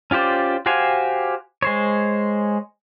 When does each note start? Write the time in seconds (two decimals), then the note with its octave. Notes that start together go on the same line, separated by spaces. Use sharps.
0.11 C#4 F4 G4 C5 D5
0.66 F#4 G4 C5 F5 G#5
1.62 G#3 C5 C#5